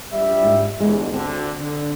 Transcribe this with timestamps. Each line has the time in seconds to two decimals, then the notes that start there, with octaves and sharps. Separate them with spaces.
0.12 A#1 G3 E5
0.42 G#2
0.80 G1 E2 D3 G#3
1.13 D2 D3 C4
1.58 D3